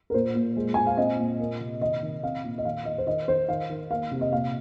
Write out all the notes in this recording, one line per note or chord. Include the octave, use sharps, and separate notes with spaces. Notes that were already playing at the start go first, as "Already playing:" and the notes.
A#4
A#2 C5
A#2
G#3
A#2 G#5
F5
C4 D#5
A#2
A#3
C3
D#3 D#5
D#3
C4 F5
A#2
D#5
D#3 F5
D#3 D#5
C5
D#3 D#5
D#3 C5
D#3 F5
D#3
A#3 F5
C3
D#5
A#2 F5